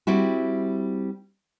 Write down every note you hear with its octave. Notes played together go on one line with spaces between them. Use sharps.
G3 C4 E4 F#4